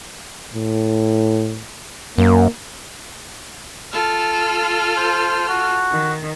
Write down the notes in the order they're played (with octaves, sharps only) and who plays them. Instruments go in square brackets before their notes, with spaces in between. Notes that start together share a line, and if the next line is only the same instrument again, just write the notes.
[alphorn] A2
[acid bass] F#2 [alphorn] A#3
[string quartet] F4 A4 F6
[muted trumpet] C5
F#4
[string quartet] D#3